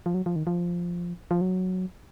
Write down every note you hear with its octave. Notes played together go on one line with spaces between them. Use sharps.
F3
F#3
F3
D#3
F3
F3
F#3